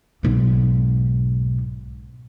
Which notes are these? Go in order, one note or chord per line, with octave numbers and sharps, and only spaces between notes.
B1 G#2